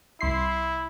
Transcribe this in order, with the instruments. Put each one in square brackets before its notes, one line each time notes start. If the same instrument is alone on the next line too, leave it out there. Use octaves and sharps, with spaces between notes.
[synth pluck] C2 C6 C7 [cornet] E4